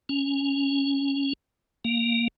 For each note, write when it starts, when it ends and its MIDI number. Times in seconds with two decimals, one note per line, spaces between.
0.09 1.33 61
1.85 2.28 58